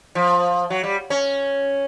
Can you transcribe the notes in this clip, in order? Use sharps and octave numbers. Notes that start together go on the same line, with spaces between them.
F3
F#3
G3
C#4